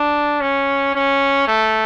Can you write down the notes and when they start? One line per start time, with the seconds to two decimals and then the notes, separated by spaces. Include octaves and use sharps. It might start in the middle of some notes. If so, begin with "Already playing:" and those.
Already playing: D4
0.41 C#4
0.95 C#4
1.48 A3